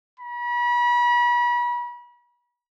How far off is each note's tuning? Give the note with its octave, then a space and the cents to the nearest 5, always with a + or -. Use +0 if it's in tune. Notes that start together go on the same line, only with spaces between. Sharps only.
B5 -35